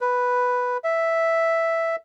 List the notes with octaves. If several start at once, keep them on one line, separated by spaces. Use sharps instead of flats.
B4
E5